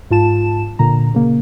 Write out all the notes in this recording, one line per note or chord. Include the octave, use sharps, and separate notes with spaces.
G#2 F4 A5 E7
A#2 D3 A#5
C#3 A#3